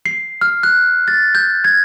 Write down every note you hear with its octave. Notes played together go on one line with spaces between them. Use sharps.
C7
F6
F#6
A6
G6
G#6